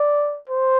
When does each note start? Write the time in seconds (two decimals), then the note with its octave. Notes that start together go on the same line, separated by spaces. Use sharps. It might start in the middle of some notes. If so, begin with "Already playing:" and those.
Already playing: D5
0.50 C5